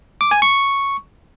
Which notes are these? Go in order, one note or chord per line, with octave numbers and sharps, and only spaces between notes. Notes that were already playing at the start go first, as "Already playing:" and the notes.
D6
G#5
C#6